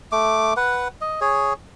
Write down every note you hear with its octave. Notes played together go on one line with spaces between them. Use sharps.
A3 D6
B4 F#5
D#5
G#4 C#5